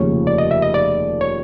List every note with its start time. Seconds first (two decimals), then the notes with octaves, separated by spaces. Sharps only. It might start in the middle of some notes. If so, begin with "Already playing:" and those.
Already playing: F1 D#2 C#3 F3 C#5
0.27 D5
0.38 D#5
0.51 E5
0.62 D#5
0.74 D5
1.21 C#5